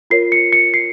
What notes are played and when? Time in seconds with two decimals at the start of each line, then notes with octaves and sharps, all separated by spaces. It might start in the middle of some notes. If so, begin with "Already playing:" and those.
0.10 F4 A#4 C#5 C7
0.32 C#7
0.53 C#7
0.74 C7